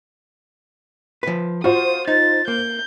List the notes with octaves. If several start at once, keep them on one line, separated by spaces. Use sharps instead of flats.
F3 B4
F4 F#4 C5 D#6
D#4 A6
A#3 G6